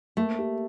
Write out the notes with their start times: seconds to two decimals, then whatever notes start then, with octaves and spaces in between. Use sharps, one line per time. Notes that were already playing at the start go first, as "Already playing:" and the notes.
0.17 A3 A#3
0.39 G4